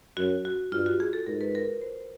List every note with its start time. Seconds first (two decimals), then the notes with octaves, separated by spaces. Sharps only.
0.17 F#2 F#4
0.45 F#4
0.72 G2 F4
0.86 F#4
1.00 G#4
1.13 A4
1.26 G#2 A#4
1.41 B4
1.55 A#4
1.82 C5